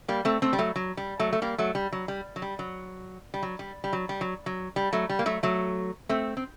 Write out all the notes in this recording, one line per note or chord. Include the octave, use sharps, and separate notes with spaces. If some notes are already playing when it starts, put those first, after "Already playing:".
G3 A#3
A3 C4
A3 C4
G3
F#3 A3
F#3
G3
F#3 A3
A3
G3 A#3
F#3 A3
G3
F#3
G3
F#3
G3
F#3
G3
F#3
G3
G3
F#3
G3
F#3
F#3
G3
F#3 A3
G3
A#3
F#3 A3
F#3 A3
A3 C4
C4